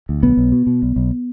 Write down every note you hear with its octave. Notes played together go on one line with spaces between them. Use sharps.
D2
B1 B3
B1
B2
B2
B1
B1